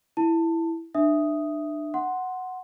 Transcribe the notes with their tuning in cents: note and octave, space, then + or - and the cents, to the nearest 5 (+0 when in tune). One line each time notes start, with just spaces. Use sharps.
E4 +0 A5 +20
D4 +30 E5 +0 D#6 +0
F#5 +0 C6 +0